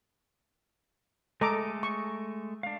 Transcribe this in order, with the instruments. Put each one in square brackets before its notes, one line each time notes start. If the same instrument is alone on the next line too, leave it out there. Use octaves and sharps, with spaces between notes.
[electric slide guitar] G#3 A3 D#5 [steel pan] A4 A#5 D6
[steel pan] C#6
[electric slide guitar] D4 F5